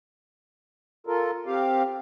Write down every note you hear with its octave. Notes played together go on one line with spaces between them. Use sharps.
F4 A4 A#4
C4 G4 F5